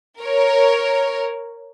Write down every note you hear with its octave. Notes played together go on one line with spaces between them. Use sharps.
A#4 C#5